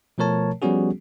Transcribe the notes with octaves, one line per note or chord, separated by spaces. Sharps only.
B2 F3 A3 A#4 C#5 A5
F3 G3 B3 C#4 F#4 G#4